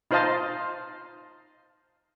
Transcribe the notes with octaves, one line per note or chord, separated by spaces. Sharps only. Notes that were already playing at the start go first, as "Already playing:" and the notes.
D#4 F4 C5 D#5 F5 A5